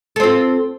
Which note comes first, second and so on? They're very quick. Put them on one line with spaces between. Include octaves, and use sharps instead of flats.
A4 C4 F4